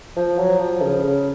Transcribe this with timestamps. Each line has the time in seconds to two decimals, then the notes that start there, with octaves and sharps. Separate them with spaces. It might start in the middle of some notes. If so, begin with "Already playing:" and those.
0.16 F3
0.38 F#3
0.59 F3
0.81 C#3
1.04 C#3